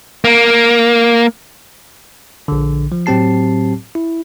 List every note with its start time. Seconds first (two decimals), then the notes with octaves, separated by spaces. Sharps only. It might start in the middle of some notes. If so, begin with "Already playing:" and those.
0.25 A#3
2.48 A#1 D3
2.92 F3
3.06 A2 F#3 C4 G4 A5 C7
3.95 E4